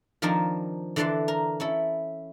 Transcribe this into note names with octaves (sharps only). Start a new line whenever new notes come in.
D#3 F3 C4 D4 A#4 A5
D3 E3 D4 D5 A5 C6
A#4
C#4 E4 A4